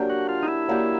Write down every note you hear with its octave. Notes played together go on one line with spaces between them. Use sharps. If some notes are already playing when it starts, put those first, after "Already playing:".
Already playing: F#3 A#3 D4 G4
F#4
F4
D#4
E4
F#3 A#3 D4 G4